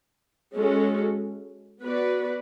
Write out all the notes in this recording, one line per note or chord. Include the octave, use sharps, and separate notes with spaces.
G#3 C#4 F#4 A4
B3 F#4 B4 D5